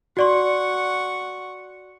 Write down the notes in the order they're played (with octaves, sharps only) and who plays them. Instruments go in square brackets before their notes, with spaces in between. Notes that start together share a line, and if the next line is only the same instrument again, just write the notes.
[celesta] F#4 D5 C6 [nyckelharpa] F#5 C#6